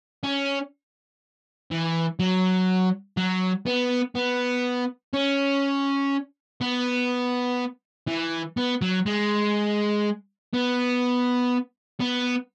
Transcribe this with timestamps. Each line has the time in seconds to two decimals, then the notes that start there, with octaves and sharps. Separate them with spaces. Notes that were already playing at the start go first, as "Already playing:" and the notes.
0.24 C#4
1.71 E3
2.20 F#3
3.17 F#3
3.66 B3
4.15 B3
5.14 C#4
6.61 B3
8.07 E3
8.57 B3
8.82 F#3
9.06 G#3
10.53 B3
12.00 B3